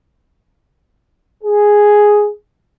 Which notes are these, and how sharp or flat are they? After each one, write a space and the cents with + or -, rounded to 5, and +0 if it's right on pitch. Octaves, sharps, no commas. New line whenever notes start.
G#4 +0